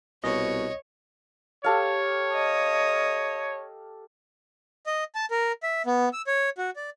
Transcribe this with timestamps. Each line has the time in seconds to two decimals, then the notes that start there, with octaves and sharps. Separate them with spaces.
0.24 C2 B2 C#5 D#5
1.64 G4 A4 C#5 F5
2.35 D#5
4.86 D#5
5.15 A5
5.31 A#4
5.63 E5
5.86 B3
6.13 E6
6.27 C#5
6.58 F#4
6.76 D5